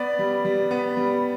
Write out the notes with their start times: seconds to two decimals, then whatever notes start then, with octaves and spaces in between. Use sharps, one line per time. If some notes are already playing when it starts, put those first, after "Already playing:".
Already playing: B3 D5
0.19 G3
0.45 G3
0.71 B3
0.97 G3